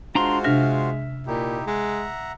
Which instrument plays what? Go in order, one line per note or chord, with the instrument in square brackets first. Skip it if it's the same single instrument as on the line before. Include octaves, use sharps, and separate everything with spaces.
[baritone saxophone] G#3 [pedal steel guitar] D4 A#5 C6 [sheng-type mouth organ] F4 F#4 C5
[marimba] C3 D4 A#6 [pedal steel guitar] E5 F6
[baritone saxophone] A#2 [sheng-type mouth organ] D#4 E4 G4
[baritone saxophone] G#3 [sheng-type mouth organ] E5 F#5 A#5